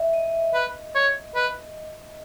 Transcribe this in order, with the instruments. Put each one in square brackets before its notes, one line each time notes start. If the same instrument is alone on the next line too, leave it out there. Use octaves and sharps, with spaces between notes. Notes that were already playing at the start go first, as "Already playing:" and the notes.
Already playing: [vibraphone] D#5 E5
D#5
[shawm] B4
C#5
[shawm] B4 [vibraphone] D#5